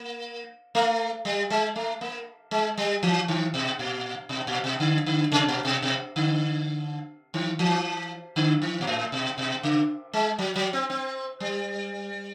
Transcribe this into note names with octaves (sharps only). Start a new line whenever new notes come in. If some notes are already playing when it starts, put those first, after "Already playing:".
Already playing: A#3
A3
G3
G#3
A3
A#3
G#3
G3
E3
D#3
B2
A#2
B2
A#2
B2
D3
D3
C3
A#2
B2
B2
D3
D#3
E3
D3
D#3
A#2
A2
B2
B2
C#3
G#3
F#3
F#3
C4
C4
G3